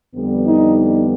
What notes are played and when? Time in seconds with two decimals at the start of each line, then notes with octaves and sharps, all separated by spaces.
0.15 F2 D3 G3 B3
0.46 D#4
0.77 D#4